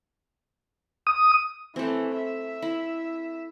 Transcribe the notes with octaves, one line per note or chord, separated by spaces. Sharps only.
D#6
E3 A3 C4
E5
E4